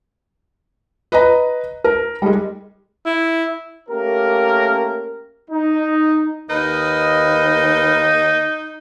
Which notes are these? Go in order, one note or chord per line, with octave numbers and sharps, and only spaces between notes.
B4 D#5 A#5
A#4
G3 G#3
E4
A3 A#3 C#4 G4 A#4
D#4
D#2 D#4 A#4 B4 D#5